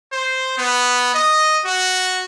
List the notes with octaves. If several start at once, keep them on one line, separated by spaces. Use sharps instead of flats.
C5
B3
D#5
F#4